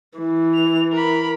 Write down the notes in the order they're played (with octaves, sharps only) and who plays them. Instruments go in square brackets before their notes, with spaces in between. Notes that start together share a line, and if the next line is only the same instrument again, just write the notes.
[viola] E3
[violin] F7
A#4 B5